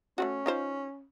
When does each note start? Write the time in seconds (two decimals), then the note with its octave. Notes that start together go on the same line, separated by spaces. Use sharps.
0.18 A3 C#4 F4 F#4
0.46 D#4 F4 C5